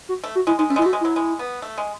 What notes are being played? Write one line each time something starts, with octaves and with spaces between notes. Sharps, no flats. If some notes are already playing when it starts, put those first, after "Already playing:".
F#4
A3
F#4
G#3 E4
G#3 D#4
A3 C#4
G#3
E4
A3 F#4
G#3
F#3 E4
G#3
B3
A3
G#3